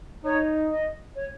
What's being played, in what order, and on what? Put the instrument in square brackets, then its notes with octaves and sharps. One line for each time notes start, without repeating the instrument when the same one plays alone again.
[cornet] D#4 [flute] C#5
[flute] D#5
C#5